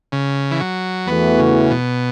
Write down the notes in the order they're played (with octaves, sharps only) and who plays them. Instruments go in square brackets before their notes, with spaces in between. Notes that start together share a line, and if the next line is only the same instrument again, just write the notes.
[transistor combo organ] C#3
E3
F#3
[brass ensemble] E2 E3 A3 F#4 [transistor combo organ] B3
[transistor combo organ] C#3
B2